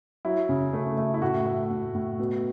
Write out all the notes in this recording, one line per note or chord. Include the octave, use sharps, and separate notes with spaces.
F#3 E4
C#3
A3
A3
E4
A2 F#4
A3 E5
A2
A2
B2